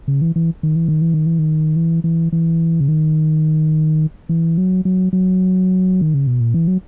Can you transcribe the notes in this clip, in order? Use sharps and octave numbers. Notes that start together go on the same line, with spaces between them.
C#3
E3
E3
D#3
E3
D#3
E3
D#3
E3
D#3
E3
E3
E3
C#3
D#3
E3
F#3
F#3
F#3
D#3
C#3
B2
A#2
E3
F#3